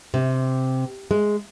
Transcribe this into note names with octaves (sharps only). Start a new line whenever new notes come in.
C3
G#3